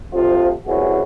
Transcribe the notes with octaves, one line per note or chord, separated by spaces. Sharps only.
D2 C3 F3 F4
C2 E3 C#4 F#4 G#4